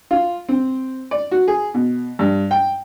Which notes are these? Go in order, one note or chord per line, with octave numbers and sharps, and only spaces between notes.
F4
C4
D5
F#4
G#4
B2
G2
G5